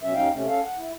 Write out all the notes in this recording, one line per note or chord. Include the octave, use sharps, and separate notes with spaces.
B2 F#3 C#4 E5
D#2 C#4 D#4 F5 G5
C3 A3 C#4
C#4 A4 F5
F#5
E4